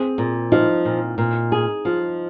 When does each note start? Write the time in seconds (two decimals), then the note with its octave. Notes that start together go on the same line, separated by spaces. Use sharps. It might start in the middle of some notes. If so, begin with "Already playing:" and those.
Already playing: C4 G#4
0.18 A#2
0.52 F3 D#4
0.85 A#2
1.18 A#2
1.52 G#4
1.85 F3 F4